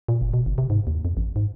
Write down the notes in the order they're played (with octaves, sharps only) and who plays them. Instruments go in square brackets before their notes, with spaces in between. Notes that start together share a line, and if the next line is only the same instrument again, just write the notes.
[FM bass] A#2
F#1
B2
G1
C3
G#2
D#2
F2
A1
G#2